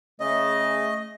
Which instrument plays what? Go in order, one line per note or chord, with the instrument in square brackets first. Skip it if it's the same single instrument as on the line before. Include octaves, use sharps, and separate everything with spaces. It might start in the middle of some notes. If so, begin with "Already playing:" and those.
[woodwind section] C#3 A3 [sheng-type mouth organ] D#5